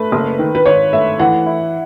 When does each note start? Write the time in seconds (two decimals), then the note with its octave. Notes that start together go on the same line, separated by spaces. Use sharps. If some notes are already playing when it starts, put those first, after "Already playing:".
Already playing: A3 B4
0.12 F#1
0.39 D#3
0.55 B4
0.65 G#1 C#5
0.93 A3 E5
1.19 E3 F#5
1.46 E4